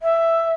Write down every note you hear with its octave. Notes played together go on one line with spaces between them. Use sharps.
E5